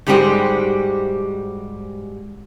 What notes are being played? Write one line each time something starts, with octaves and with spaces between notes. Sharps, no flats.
G#2 G3 G#3 F#4 G4 C5